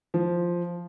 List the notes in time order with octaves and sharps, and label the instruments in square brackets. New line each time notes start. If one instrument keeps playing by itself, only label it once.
[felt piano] F3